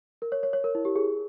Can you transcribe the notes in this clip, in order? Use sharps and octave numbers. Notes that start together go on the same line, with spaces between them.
A#4
C#5
C#5
C#5
A#4
E4
G4
G#4